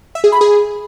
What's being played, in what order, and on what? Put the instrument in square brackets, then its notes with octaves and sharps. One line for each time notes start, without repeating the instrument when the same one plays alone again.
[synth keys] E5
G#4
B5
G#4